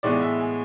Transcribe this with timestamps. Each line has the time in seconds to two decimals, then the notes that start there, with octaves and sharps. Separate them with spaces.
0.03 A2 E3 G#3 B3 D5
0.21 E5
0.40 G#5